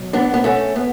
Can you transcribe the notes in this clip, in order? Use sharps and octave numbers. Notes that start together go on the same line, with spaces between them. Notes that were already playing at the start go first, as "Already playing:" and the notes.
Already playing: B2 F#3
B3 D4
B3
A3 C#4
B3